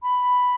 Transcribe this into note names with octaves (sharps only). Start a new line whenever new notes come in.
B5